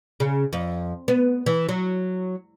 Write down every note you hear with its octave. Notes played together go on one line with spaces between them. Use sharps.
C#3
F2
B3
E3
F#3